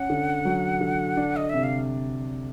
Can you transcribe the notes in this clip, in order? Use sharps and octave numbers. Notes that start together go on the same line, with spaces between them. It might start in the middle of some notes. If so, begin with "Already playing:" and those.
Already playing: C#4 F#5
D3
F#3
D3
D4
D#5
C3 E5
F5